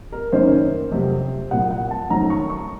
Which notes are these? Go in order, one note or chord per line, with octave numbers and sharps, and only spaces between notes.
A#4
F#1 F#2 D#3 A#3 C#4 C5
F2 C3 F#3
C2 A#2 F#3 F#5
F#5
A5
F2 D#3 F#3 A3 C#4 A#5
C#6
C#6